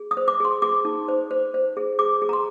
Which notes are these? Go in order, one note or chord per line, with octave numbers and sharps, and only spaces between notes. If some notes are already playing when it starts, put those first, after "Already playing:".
Already playing: G#4
D#6
C5
D6
G#4 C6
G#4 D6
D#4
C5
C5
C5
G#4
G#4 D6
G#4
A#5
C6